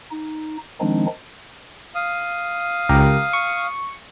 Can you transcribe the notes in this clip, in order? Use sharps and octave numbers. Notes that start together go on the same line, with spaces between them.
D#4
D#3 F3 G#3 C4 D4 D#4
F5 D#6
C#2 G4 A#4
C#6